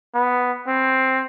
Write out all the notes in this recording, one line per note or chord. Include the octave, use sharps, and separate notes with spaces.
B3
C4